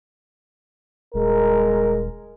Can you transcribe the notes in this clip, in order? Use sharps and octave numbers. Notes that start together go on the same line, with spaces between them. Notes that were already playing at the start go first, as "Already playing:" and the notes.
D#1 G#3 A#4